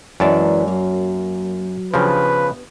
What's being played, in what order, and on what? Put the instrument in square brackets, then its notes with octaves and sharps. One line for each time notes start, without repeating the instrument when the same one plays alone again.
[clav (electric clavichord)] F#2 A5 [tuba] E3 [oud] G#3 D4 D5
[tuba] F#3 [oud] A#3
[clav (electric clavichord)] C#3 F3 [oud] B3 D4 G4 [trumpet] B4